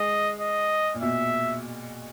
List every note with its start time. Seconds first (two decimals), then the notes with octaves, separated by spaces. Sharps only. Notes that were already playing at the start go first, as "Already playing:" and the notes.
Already playing: G#3 D#5
0.39 D#5
0.94 A#2
1.02 B2 E5